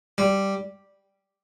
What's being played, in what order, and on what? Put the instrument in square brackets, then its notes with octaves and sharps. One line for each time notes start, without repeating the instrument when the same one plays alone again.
[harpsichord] G3